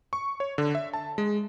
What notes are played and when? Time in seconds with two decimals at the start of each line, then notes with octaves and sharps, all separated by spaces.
0.13 C#6
0.40 C#5
0.58 D3
0.75 E5
0.93 A5
1.18 G#3